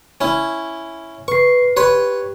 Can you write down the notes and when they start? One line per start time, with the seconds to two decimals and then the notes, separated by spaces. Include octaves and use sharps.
0.21 C#4 E4
1.28 B4 C#6 C7
1.77 G4 B4 C#5 C6